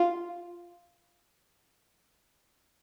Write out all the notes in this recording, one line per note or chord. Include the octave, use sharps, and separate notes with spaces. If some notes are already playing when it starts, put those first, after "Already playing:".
Already playing: F4